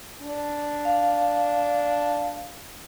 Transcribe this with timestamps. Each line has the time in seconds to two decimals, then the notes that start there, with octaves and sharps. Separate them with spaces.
0.22 D4
0.85 F5